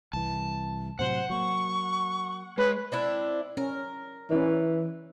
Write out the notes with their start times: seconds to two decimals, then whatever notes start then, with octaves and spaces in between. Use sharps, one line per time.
0.13 C2 E3 A5
0.99 A2 C3 F#3 C5 F#5
1.30 F#3 A#3 C#6
2.58 G#3 B4 C#5
2.92 C4 D4 E4
3.57 C#4 A#4
4.30 E3 C#4 E4 D5